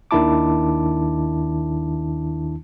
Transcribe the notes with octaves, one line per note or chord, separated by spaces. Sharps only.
D#2 D#3 D4 E4 A5 D6